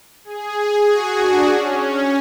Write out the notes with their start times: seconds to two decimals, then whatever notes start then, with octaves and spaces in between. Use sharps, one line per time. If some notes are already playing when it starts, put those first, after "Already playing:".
0.24 G#4
0.86 F#4
1.16 D4
1.47 C#4